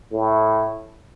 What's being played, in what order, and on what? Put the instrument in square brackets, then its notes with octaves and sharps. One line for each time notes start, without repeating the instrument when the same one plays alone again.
[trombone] A2